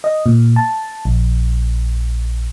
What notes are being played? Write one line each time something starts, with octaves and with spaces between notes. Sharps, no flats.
D#5
A#2
A5
A#1